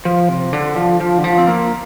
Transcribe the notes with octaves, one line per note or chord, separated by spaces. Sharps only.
F3
C3
D3
F3
F3
D3
F3
C4
A#3